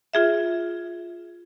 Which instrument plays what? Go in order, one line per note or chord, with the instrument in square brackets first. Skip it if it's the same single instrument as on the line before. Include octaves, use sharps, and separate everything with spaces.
[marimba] F4 G#4 E5